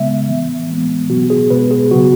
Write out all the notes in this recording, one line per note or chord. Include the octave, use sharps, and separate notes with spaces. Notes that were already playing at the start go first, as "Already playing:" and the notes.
Already playing: C#3 G#3 B3 E5
E3 B3
E3 G#3 B3
B2 F#3 B3 F#4
G#4
B2 G#3 B3 B4
G#4
C#3 F#3 B3 F#4